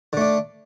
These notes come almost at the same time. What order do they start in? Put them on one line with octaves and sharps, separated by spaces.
D3 A3 D4